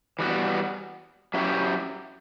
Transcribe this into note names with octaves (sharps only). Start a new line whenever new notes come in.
E3 G3 B3 F#4
F#3 C#4 E4 G4